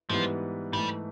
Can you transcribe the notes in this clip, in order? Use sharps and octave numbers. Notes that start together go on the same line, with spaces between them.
G#2 E3 F3 G3 B3
G#2 E3 G3 A3